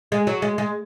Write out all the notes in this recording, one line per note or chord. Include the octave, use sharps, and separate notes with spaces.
G#3
F#3
G#3
G#3